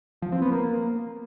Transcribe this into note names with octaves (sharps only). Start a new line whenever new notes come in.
F3
C4
B3
A#3